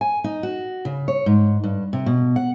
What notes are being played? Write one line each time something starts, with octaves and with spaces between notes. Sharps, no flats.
G#5
D#4
F#4
C#3
C#5
G#2
G2
C3
B2
F#5